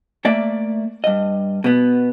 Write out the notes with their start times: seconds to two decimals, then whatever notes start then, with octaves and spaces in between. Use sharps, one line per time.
0.25 A3 A#3 D5 E5
1.04 G2 D#5
1.64 B2 B3